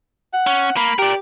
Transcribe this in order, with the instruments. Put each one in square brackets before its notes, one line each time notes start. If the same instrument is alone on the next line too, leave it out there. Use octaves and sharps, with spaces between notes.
[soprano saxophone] F#5
[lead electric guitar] C#4
[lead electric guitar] A#3 [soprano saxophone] B5
[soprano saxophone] G4 [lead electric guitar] A#4 D5